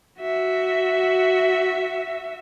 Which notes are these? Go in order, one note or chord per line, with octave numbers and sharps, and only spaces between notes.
F#4 E5